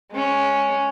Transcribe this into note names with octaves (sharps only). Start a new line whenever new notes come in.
G#3 C#4